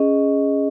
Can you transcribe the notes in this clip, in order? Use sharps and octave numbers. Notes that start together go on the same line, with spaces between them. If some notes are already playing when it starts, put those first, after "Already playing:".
Already playing: C#4 G#4 D#5